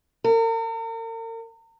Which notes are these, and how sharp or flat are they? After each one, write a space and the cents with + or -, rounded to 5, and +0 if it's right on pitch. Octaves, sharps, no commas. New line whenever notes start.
A#4 -40